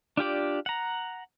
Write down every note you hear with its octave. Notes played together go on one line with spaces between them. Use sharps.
D4 F4 G4 D5
F#5 A#5